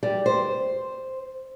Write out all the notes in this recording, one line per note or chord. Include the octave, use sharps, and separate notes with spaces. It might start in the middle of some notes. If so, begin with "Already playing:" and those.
G3
C5